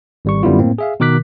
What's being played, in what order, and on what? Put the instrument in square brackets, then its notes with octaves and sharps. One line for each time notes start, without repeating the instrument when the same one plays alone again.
[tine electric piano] G#1 G3 C#6
F#2 D3 G3 B3 E4 F4
A2 A#3 C4
G#4 E5 F5
B2 D#3 A#4 D6 F#6 B6